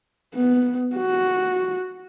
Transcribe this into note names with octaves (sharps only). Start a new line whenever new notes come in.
B3
F#4